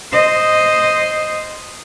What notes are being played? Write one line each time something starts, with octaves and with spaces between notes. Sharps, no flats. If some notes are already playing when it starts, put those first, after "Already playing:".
C5 D#5